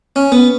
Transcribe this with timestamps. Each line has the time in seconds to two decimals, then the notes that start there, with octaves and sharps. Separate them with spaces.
0.16 C#4
0.32 B3